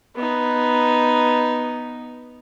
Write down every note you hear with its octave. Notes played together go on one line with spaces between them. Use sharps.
B3 D#4